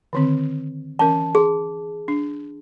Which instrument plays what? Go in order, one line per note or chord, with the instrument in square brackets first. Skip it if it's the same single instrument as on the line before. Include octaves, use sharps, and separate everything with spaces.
[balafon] D3 D#3 C4
[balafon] E3 C#4 A#4 [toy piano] A5
[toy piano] G#4 [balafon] C6
[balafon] D4